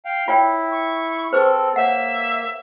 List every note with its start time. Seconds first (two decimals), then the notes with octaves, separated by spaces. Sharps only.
0.05 F5 G5
0.28 E4 F4 C#5 G5
0.72 C#6
1.33 C4 G#4 A4 B4 C5
1.76 A#3 C#5 E5 F#5